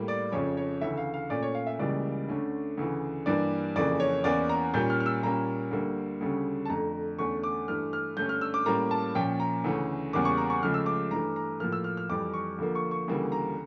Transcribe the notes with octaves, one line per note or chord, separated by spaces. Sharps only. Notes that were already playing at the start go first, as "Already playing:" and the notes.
Already playing: A2 G3 A#3
D5
F2 C#3 F3 C#4 C#5
C#5
D2 C#3 E3 E5
F5
F5
A#2 A3 C#4 D5
C#5
F5
E5
C#2 C#3 E3 G3 A#3 D5
D2 D3 A3 C#4
D2 C#3 E3
G2 E3 G3 A#3 D5
F2 C#3 E3 A#3 D5
C#5
E2 E3 A#3 C#4 D5
A#5
A#2 G3 A#3 C#4 G6
F6
F6
E6
A#2 G3 A#3 C#4 A#5
D2 D3 G3 A#3
D2 C#3 G3 C#4
A5
F2 D3 A3 A#5
E2 D3 A3 C#4 C#6
D6
G2 E3 A3 F6
F6
G2 D3 A3 C#4 G6
F6
E6
D6
A2 G3 A#3 C#4 A#5
A5
A#2 F3 C#4 G5
A#5
D2 C#3 E3 A3 C#4
E2 C#3 G3 A#3 C#4 D6
C#6
A#5
C#6
C#2 C#3 F3 A3 C#4 F6
E6
D6
G2 E3 A3 A#5
A#5
A2 F3 A#3 F6
E6
F6
F6
F2 E3 G3 D6
C#6
D2 D3 F3 A#3
C#6
C#6
D2 C#3 E3 G3 A#3
A#5